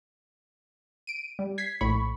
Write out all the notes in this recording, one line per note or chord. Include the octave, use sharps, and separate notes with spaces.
D7 D#7
G3
G#6 B6 C7
A#1 A2 B5 C#6